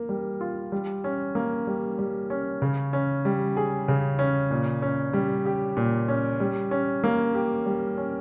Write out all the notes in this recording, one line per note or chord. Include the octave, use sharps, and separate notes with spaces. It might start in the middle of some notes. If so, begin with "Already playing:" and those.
Already playing: A#3 A#4
G3
F4
G3
C#4
A#3
G3
G3
C#4
C#3
C#4
G3
G#4
C#3
C#4
A#2
C#4
G3
G4
A#2
C#4
G3
C#4
A#3
G4
G3
C#4